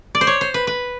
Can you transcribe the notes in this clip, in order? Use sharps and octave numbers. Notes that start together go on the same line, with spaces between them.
D5
C5
C#5
C5
B4
B4